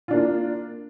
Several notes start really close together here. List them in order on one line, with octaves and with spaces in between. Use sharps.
F4 D4 A#3